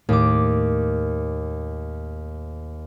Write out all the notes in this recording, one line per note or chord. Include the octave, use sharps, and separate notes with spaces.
D#2 A2 D6